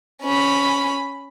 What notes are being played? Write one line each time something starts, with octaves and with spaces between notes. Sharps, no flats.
C#4 B5